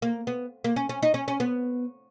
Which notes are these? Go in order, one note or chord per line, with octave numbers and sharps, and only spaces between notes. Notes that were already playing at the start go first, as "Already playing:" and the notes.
A#3
B3
A#3
C#4
C#4
D#4
C#4
C#4
B3